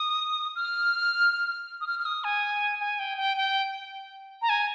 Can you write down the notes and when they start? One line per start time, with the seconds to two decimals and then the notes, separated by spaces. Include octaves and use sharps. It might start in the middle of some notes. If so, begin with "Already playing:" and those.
Already playing: D#6
0.56 F6
1.81 D#6
1.87 F6
1.99 F6
2.05 D#6
2.24 G#5
2.80 G#5
2.99 G5
3.18 G5
3.37 G5
4.42 A#5
4.49 G#5